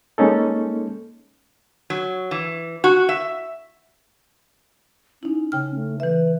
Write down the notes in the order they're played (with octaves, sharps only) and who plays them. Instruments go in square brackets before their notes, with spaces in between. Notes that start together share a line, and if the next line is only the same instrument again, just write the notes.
[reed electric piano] G#3 A#3 C#4 D#4 A4
[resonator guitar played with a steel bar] F#3
E3
F#4
E5
[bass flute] C#4 [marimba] D#4 E4
[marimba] C#3 G5 F6
[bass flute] A3
[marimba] E3 E5 [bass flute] B4